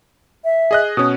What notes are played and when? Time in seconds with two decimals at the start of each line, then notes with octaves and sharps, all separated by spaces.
0.44 E5
0.71 G#4 D#5 F#6
0.97 B2 C#4 D#6